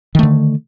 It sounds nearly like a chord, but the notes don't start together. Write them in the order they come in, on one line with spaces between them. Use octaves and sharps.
D#3 A3 D3